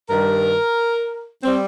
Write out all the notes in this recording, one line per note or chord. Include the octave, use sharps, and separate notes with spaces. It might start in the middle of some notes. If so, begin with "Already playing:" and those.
G2 D#3 G3 A#4
G3 C4